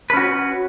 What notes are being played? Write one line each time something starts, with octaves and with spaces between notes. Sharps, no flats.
C#4 F#4 B4